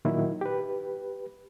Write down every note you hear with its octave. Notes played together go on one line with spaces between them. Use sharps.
A#2 D#3 F#3 E4
G4 B4